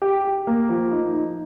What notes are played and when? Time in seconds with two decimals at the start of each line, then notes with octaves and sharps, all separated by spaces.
0.02 G4
0.25 G4
0.47 A#3
0.69 F3
0.92 D#4
1.14 D#4